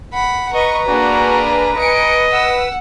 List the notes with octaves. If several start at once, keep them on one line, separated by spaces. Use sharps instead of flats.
F#5 B5
B4 D#5 A#5 C#6
A#3 D4 F#4 G#4
D#5 G#5 C#7 D7
F#5 E6